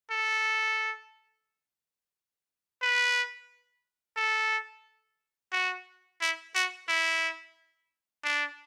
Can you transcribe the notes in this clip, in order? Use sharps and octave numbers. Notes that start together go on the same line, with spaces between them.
A4
B4
A4
F#4
E4
F#4
E4
D4